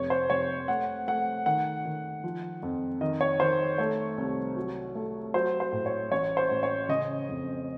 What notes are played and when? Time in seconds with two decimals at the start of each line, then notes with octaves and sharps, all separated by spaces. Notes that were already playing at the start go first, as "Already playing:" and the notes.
Already playing: F1 C#5
0.10 C5
0.30 F1 C#5
0.68 A3 F#5
1.07 A3 F#5
1.46 D#3 F#5
1.85 D#3
2.24 F3
2.63 F2
3.01 D#3 D#5
3.21 C#5
3.40 D#3 C5
3.78 A3 C#5
4.17 C2
4.56 F#3
4.95 A3
5.34 F#3 C5
5.60 C5
5.72 A2
5.86 C#5
6.11 A1 C#5
6.37 C5
6.50 A1
6.63 C#5
6.89 C#3 D#5
7.29 F2